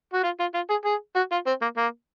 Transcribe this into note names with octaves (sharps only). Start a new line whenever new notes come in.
F#4
F4
F4
F4
G#4
G#4
F#4
F4
C4
A#3
A#3